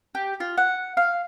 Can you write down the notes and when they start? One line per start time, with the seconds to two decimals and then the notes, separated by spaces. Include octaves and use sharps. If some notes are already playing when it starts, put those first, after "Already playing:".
0.15 G4
0.40 F4
0.57 F#5
0.97 F5